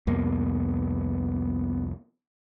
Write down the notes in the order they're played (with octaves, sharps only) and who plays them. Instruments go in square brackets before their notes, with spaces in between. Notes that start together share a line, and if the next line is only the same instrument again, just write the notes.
[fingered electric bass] C2 F2 A#3 [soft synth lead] B3